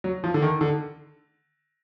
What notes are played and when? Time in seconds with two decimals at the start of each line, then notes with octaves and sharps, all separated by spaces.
0.04 F#3
0.24 F3
0.34 D3
0.42 D#3
0.61 D3